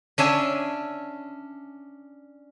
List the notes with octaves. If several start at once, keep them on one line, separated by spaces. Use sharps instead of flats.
C#4 D4 E5 G#5